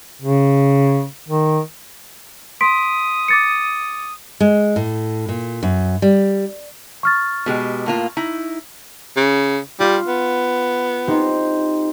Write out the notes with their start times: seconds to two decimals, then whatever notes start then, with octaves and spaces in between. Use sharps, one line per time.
0.22 C#3
1.28 D#3
2.61 C6 D#6 B6 D7
3.28 D6 A6 C#7
4.40 G#3
4.76 A2
5.29 A#2
5.63 F#2
6.02 G3
7.03 C#6 F6 A6
7.46 B2 G#3 G4
7.86 A2 A#3 F4
8.17 D#4 E4
9.17 C#3
9.80 G3 F4
10.07 B3
11.08 C4 D#4 G4